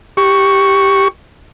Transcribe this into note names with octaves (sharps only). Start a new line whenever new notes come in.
G4 C#6